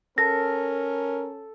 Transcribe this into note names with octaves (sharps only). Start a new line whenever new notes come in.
C#4 A4 A#4 A#6